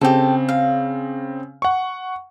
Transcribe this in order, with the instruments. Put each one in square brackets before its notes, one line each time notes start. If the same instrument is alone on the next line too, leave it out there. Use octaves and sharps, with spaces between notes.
[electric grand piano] C#3 C4 [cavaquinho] G4 A4
[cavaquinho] F5
[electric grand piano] F#5 C#6